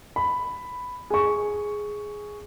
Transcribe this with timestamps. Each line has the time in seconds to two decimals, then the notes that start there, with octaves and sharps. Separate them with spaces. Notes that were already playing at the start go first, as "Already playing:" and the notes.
0.16 B5
1.10 G#4 C#6